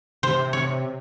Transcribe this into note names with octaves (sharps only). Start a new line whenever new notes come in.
C3 C5
C#5